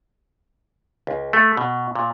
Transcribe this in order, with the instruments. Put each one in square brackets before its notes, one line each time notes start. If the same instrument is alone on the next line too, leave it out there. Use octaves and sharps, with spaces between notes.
[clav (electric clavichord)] C#2
A3
B2
A#2